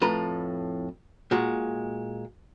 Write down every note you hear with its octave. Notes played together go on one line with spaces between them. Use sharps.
F2 A2 B4 A#5
A#2 G#3 F#4